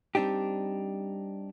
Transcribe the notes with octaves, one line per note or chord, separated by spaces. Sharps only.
G3 C4 D4 D#4 G4